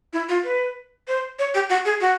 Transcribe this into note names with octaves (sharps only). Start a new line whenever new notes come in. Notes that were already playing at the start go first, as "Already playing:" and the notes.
E4
F4
B4
C5
C#5
G4
F#4
G#4
F#4